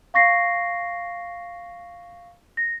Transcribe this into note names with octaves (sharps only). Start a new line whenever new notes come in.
F5 C#6 A#6 C7
A#6